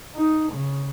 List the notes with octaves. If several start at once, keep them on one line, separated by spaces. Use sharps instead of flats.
D#4
C#3